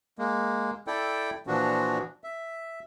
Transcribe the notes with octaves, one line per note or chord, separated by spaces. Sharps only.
G#3 A#3
E4 A4 D5 G5
A#2 E3 F3 D4 F#4
E5